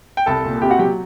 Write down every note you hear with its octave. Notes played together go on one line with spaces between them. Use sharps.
G5
C2 A4 A5
A#2
C3 G4 G5
F#4 F#5
F#3 G4 G5